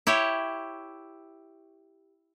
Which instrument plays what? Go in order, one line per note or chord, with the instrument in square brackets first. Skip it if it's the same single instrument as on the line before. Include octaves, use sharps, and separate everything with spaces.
[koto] E4 G4 C#5